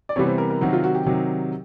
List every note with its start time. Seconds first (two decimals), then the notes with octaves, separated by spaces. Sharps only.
0.09 D5
0.16 C3 E3 G3 B3 C#5
0.27 C5
0.38 A#4
0.50 A#4
0.61 C3 D#3 F#3 F#4
0.73 F4
0.84 F#4
0.95 G4
1.06 C3 D#3 F#3